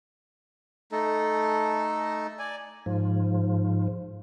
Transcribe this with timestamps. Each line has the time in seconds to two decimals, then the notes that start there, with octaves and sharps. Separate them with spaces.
0.92 A3 D#4 A4
2.39 D5 G#5
2.86 G#2 F3